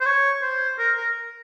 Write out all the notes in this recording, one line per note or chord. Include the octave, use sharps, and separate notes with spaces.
C5
C#5
C5
A#4
A#4